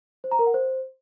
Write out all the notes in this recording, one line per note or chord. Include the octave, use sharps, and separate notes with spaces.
C5
A#5
A#4
F#5
C5